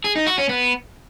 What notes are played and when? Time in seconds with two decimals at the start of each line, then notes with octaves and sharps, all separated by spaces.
0.04 G#4
0.16 D#4
0.27 F#4
0.38 C#4
0.49 B3